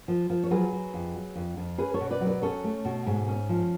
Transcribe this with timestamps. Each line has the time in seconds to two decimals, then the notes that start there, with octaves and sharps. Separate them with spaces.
0.08 F3
0.30 F3
0.43 C#5
0.51 F#3 G#4 B4
0.72 F#3
0.94 F2
1.14 F#3
1.35 F2
1.57 F2
1.78 C#4 G#4 B4
1.94 A4 C#5
2.01 B2
2.11 B4 D5
2.21 F#3
2.27 B4 D5
2.42 C#4 A4 C#5
2.64 A3
2.85 B2
3.06 G#2
3.28 C#4
3.49 F3